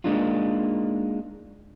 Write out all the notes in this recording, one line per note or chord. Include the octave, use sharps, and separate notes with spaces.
G#3 A#3 D4 D#4 F4